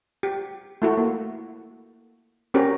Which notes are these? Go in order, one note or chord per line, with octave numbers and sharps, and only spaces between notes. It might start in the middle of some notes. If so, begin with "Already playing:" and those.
G4
A3 E4 F#4
A#3
C4 C#4 F#4 G4 A#4